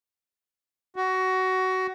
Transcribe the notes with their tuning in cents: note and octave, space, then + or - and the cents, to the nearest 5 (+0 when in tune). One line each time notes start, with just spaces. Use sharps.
F#4 +20